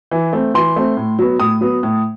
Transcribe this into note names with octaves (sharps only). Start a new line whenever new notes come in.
E3
A3 C4
E3 C6
A3 C4
A2
F#3 B3
A2 D#6
F#3 B3
A2